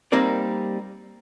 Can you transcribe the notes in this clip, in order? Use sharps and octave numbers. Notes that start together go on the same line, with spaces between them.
G3 A#3 C4 D#4 A#4 D5